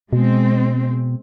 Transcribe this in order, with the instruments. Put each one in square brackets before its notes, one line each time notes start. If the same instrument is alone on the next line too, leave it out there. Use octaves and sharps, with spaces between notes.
[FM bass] B2 [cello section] G#3 C4